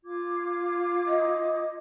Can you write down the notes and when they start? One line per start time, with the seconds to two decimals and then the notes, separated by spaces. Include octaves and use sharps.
0.04 F4 D6 G#6
1.07 D#5